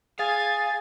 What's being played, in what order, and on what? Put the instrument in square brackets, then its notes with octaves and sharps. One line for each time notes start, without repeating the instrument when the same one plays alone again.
[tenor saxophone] G#4 [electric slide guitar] F5 [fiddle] G#5 [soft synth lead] A6